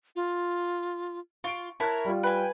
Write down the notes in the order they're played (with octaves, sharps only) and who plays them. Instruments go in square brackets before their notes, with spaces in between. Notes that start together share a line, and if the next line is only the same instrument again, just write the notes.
[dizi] F4
[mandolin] F4 [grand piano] C#6 D7
[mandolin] E4 C#5 [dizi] A#4 [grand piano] A5 F#6
[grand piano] G3 F4
[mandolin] B4 G#5 [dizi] G5